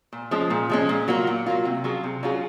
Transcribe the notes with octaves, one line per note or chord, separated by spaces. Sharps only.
A#2
F3 G#3 C#4
A#2
F3 G#3 C#4
A#2
F#3 A#3 F4
A#2
F#3 A#3 F4
C3
F#3 C#4 F4 G#4
C3
F#3 C#4 F4 G#4